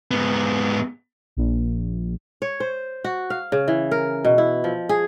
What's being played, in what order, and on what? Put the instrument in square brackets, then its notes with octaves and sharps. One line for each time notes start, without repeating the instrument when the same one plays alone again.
[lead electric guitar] G#2 B3
[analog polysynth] A#1
[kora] C#5
C5
F#4
F5
C#3
E3
A#4
B2
E4
F3
G#4